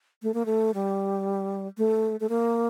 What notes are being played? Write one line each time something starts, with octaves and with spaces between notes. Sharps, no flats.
A3
A#3
A3
G3
A3
A3
A#3